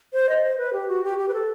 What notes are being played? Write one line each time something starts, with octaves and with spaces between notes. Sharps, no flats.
C5
D#5
C5
B4
G4
F#4
G4
G4
B4
A4